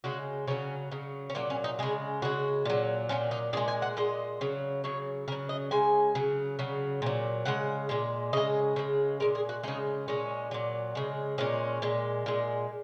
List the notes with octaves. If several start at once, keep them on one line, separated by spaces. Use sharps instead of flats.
C#3 G#3 F#4
C#3 F#3 C#4
C#3 F#3
C#4
A#2 F#3 A#3
C#4
D#4
C#3 G#3 G#4
C#3 G#3 F#4
A#2 F#3
A#2 F#3 C#4
D#4
A#2 G#3 G#4
G#5
F#5
A#2 G#3 D#5
C#3 F#3
C#3 F#3 C#5
C#3 F#3 A#4
D#5
C#3 G#3 G#5
C#3 F#3
C#3 F#3
A#2 F#3
C#3 G#3 F#5
A#2 G#3
C#3 G#3 D#5
C#3 G#3
A#2 G#3 A#4
G#4
F#4
C#3 G#3 D#4
A#2 G#3 C#4
A#2 F#3
C#3 G#3
A#2 G#3 C#4
A#2 G#3
A#2 G#3